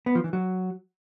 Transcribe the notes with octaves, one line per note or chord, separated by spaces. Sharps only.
B3
F3
E3
F#3